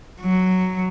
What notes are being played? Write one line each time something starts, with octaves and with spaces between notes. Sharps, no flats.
F#3